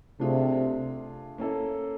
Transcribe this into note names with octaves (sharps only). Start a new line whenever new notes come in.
C3 A3 D4 F4 G#4
A#3 C#4 E4 A4